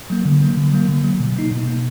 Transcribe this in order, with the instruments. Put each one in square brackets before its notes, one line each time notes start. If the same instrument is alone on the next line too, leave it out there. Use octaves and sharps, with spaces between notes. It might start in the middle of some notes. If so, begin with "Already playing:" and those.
[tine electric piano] F#3 A#3
D3
F#3 A#3
D3
F#3 A#3
D3
F#3 A#3
B2
A#3 D#4
B2
A#3 D#4